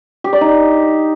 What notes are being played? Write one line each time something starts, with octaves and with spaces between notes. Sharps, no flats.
G4
D5
D#4